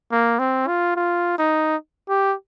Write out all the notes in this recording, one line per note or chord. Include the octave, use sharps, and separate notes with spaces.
A#3
C4
F4
F4
D#4
G4